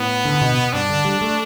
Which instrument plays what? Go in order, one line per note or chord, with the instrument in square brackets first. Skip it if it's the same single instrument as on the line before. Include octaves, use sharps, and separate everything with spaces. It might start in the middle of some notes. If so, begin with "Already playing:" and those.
Already playing: [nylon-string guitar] A2 [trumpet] B3
[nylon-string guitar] D3
B2
B2
[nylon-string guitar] G2 [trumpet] D4
[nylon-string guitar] D3
G3
A3